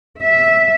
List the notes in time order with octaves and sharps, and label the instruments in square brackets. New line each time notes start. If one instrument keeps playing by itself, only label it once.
[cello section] E5